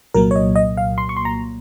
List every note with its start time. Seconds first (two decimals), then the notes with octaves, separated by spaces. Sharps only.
0.14 C2 A#2 F#3 A#3 A#4
0.31 C#5
0.36 D#5
0.56 D#5
0.77 F5
0.98 C6
1.09 C#6
1.17 C6
1.25 A#5